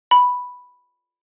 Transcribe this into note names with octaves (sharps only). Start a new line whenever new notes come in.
B5